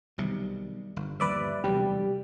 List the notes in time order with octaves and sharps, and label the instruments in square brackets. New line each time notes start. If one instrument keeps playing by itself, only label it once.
[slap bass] B1 C3 [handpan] D#3 G3
[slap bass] G1
[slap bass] G1 D#2 F3 [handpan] G3 [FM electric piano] B4 D5 E5
[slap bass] E1 D2 F#3 [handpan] C3 [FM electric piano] G3